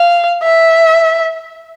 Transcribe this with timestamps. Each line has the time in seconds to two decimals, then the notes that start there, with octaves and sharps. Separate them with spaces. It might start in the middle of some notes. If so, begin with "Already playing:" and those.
Already playing: F5
0.43 E5